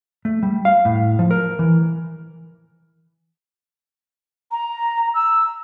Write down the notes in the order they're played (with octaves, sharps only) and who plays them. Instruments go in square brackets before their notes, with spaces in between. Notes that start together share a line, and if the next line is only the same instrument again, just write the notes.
[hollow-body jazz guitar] A3
G3
F5
A2
F3
A#4
E3
[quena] A#5
E6